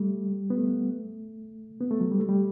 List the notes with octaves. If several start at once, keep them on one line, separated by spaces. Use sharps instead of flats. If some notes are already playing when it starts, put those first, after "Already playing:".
Already playing: G3 A3
B3
A3
B3
A3
F#3
G3
A3
G3